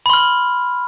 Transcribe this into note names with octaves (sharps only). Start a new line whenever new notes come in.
B5 C6 F6